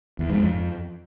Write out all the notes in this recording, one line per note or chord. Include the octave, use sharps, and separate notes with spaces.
E2
G#2
F2